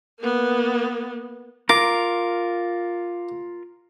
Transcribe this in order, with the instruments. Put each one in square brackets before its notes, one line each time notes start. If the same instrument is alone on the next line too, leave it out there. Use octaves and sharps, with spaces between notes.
[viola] A#3 B3
[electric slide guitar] F4 A#4 [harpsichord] D6